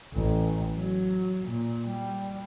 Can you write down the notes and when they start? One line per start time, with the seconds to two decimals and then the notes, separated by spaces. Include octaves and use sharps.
0.14 A1
0.76 F#3
1.45 A#2
1.86 G3